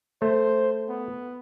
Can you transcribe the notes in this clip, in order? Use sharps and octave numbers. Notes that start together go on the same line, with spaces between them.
A3 C5
B3